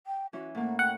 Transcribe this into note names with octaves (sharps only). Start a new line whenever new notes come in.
G5
E3 C#4 F#4
A2 A#3 F#5
F#5 G5